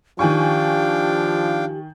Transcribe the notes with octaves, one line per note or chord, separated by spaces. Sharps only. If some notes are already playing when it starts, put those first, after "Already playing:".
D#3 F3 D4 G4 F5 G5 G#5 C#6